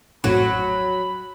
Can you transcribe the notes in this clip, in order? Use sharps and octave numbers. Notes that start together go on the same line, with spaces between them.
A1 F2 A2 F#3 B5